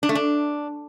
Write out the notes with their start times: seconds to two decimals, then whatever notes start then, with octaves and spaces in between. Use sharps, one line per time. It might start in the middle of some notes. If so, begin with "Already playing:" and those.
0.03 D4
0.09 A3
0.15 D4